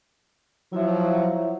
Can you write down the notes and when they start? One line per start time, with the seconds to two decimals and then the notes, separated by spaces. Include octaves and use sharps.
0.73 F3 F#3 E4 C#5 E5